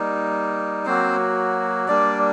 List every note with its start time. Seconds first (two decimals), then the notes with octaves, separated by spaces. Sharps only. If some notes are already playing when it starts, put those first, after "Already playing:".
Already playing: G3 A#3 D#4
0.86 F#3 A#3 C4 F#4 C5
1.88 G3 A#3 D4 D5